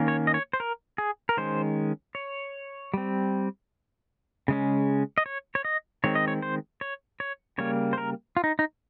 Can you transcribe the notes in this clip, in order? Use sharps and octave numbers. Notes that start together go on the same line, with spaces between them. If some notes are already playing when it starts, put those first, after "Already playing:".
Already playing: D#3 A#3 C#4
C#5
D#5
C#5
C5
A#4
G#4
A#4
D#3 G#3 C#4 C5
C#5
G3 C4
C#3 G#3 C#4
D#5
C#5
C#5
D#5
D#3 G#3 C4 C#5
D#5
C#5
C5
C#5
C#5
C#3 G3 A#3 C#5
C5
A#4
F4
D#4
D#4